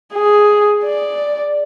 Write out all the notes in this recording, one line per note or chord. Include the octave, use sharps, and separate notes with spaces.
G#4
D5